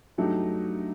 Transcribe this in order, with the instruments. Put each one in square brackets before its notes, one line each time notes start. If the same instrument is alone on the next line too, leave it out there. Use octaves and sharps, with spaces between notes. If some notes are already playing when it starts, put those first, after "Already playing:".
[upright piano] G2 F#3 A3 D#4 G4